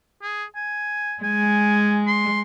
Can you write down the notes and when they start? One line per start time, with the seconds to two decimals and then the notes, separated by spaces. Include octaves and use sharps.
0.22 G#4
0.56 G#5
1.23 G#3 G#5
2.07 C6